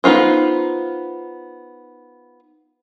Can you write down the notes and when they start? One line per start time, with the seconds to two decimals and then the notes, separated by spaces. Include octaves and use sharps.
0.04 B3 D#4 F4 C5